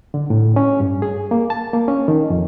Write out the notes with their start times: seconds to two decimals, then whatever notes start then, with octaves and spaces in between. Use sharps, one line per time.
0.14 D3
0.30 A2
0.56 C#4
0.80 G2
1.02 G#4
1.31 A#3
1.50 A5
1.73 A#3
1.88 C#4
2.08 D#3
2.30 F2